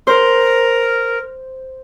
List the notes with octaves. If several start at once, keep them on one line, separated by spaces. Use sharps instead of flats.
A#4 C5